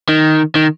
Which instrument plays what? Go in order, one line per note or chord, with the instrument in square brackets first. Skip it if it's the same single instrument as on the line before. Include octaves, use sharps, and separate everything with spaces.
[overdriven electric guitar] D#3
D#3